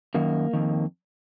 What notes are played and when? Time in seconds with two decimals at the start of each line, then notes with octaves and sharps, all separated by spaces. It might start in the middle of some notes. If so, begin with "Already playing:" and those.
0.14 F#2 D#3 A#3
0.53 F2 D#3